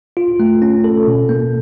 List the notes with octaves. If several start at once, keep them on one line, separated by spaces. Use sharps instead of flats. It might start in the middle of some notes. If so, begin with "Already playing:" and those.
F4
A3
C#4
A4
B2
A#3